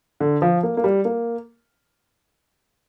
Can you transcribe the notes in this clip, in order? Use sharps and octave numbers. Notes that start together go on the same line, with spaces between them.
D3
F3
A#3
A#3
G3
A#3